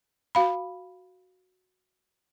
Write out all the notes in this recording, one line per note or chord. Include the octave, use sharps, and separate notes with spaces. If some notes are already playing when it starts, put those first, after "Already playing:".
F#4 F5 B5